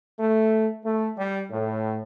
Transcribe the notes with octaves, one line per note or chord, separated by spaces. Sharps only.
A3
A3
G3
A2